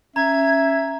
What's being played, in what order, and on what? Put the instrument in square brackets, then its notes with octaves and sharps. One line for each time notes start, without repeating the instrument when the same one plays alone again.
[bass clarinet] C#4 [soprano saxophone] E5 [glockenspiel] A#5 [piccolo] G#6